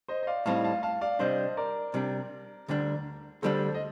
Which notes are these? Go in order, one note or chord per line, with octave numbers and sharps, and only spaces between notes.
C5 D#5
D#5
D5 F5
A2 G3 C4 D#4 F5 A5
F5 A5
F5 A5
D5 F5
C3 G3 D4 C5 D#5
A#4 D5
C3 G3 D4
D2 D3 G3 D4
D2 D3 G3 D4 A4 C5
D#5